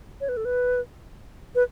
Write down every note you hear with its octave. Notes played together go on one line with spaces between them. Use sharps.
C#5
B4
A4
B4
B4